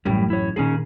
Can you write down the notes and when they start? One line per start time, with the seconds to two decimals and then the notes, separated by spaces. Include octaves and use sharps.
0.05 A1 F#2 A2 G3
0.30 E4 C#5
0.56 A#2 D#3 C#4 D#4 G#4